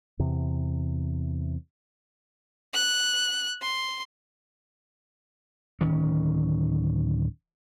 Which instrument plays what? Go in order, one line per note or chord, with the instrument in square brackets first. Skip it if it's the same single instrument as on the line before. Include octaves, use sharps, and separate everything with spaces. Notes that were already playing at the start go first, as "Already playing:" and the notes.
[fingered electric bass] E2 C3
[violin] F#6
C6
[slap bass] D1 D#3 C#4